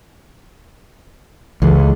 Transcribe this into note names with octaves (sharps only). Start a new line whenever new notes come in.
C#2 E3 G#4 A4